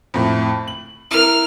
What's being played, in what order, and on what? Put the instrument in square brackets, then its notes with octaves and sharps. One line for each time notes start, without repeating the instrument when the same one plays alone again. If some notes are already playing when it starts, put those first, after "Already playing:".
[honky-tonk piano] F2 A2
F#7
[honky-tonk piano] E4 A#4 [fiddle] F6